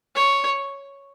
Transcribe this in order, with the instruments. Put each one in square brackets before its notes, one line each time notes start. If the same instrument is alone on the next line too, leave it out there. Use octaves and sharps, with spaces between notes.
[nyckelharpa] C#5